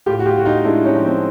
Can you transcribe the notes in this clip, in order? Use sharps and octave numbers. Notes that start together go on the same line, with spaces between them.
A2 F4 G4
F#4
F4 G4
A2 F#4
D#4 F4
G#3 D4 E4
C#4 D#4
F3
C4